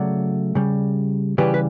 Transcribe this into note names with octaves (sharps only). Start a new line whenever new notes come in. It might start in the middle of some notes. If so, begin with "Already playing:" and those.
Already playing: C#3 F#3 A3 D5 F#5
C#3 G3
C#3 E3 G3 G4 B4
B4